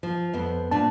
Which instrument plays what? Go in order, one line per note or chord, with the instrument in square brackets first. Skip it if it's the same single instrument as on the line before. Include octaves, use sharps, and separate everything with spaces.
[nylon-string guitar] F3
F2 B3 C5
[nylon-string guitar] A#2 D4 [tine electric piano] A5